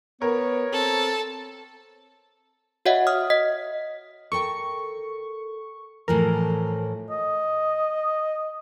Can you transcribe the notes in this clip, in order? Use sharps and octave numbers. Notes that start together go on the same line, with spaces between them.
B3 A#4 C#5
C4 A4
F#4 C#5 D#5 E5 F#5
D#6 F6
D#5 B6
A4 A#4 G5 C#6
A2 E3 F3 A#4
D#5